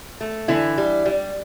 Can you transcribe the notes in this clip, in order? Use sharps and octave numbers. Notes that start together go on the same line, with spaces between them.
A3
D3 E3 E4
G3
G3